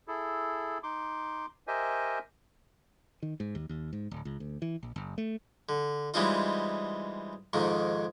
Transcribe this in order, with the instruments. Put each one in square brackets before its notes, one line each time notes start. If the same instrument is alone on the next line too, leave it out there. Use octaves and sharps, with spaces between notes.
[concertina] E4 G#4 A4
D#4 C6 D6
G4 A#4 C5 D#5 E5 G#5
[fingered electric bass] D#3
G#2
D#2
D#2
G#2
D1
C#2
D2
E3
A#1
F#1
A3
[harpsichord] D3
E3 G3 G#3 C4 D#4 F4
F2 G#2 D#3 A#3